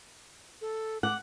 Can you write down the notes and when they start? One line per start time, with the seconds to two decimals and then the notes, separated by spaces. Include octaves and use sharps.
0.61 A4
1.03 F#5 D6